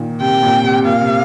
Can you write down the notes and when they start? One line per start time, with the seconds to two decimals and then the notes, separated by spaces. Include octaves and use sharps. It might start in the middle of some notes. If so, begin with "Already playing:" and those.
Already playing: A#2 D#3
0.21 C3 G5
0.43 A#2
0.64 C3
0.85 A#2 F5
1.01 C3